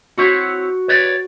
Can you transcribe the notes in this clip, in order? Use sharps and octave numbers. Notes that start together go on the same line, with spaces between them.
C4 E4 F#4 C#5
B4 C#5 D5